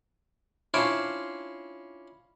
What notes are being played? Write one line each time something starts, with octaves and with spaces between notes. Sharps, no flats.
C#4 D4 E4 F4 C5 D5